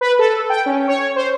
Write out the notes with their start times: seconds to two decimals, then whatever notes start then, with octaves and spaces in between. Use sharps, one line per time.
0.01 B4
0.19 A4
0.50 G5
0.66 C#4
0.88 C#5
1.16 C5